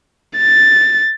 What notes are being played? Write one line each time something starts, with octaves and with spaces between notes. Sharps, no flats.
A6